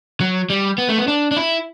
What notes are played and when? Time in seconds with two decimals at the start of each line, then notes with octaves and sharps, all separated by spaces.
0.21 F#3
0.50 G3
0.78 B3
0.89 A3
0.97 B3
1.08 D4
1.31 D4
1.37 E4